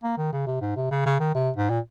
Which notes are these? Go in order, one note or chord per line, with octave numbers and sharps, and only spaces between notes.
A#3
D#3
C#3
C3
G#2
C3
C#3
C#3
D#3
C3
G#2
A#2